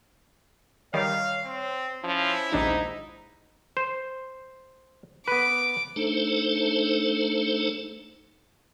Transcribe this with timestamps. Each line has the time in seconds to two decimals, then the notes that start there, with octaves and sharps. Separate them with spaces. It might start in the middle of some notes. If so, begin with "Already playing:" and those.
0.94 D#3 G3 C#5 F5
1.45 C4
2.04 F3 C#4 E4
2.53 A#1 D#2 G#2 D4 D#4
3.77 C5
5.28 B3 B4 D6
5.96 A3 D4 D#4 A4 C5